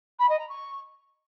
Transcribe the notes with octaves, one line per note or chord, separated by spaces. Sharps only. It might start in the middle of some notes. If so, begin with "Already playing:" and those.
B5
D#5
A#5
C#6